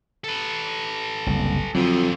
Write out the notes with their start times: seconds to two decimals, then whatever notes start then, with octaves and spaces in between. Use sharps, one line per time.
0.24 A4 B4
1.27 F#1 C2
1.75 F2 D3 F3 F#3